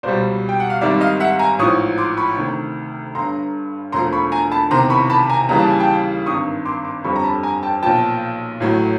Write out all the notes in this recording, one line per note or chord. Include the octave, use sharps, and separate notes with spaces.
C#2 B2 G3 C5 D5
G5
F#5
F5
G#1 G#2 D#3 G3 D5 E5
D#5 F5
E5 F#5
G#5 A#5
A1 G#2 F3 C#6 D#6
C6 D6
B5 C#6
D2 C3 D#3
G1 G2 D3 A#5 C6
E1 D2 D3 F3 A#5 C6
B5 C#6
G#5 A#5
A5 B5
E1 E2 C3 D#3 A#5 C6
B5 C#6
A5 B5
G#5 A#5
D#2 C#3 E3 G3 A#5
A5
G#5
G5 A5
G#1 G2 D#3 C#6 D#6
C6 D6
C6 D6
G1 F2 D3 G3 B5 C#6
A#5
A5 B5
G#5 A#5
G5 A5
B1 A#2 F3 G5 A5
A1 A2 F#3